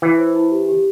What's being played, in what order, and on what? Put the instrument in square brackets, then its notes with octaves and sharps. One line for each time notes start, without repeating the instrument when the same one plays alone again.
[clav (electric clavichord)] E3 [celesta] E4
[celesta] C5
E4
G4
G4